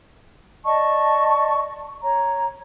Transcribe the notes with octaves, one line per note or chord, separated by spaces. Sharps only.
D5 D#5 A5 C#6
C#5 A#5